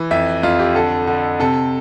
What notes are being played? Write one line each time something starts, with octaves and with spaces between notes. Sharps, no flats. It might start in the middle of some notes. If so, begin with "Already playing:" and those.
Already playing: E3
F2 E5
F2 F4
G4
D3 A4
D3
C3 A4